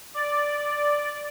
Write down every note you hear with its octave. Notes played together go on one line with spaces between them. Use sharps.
D5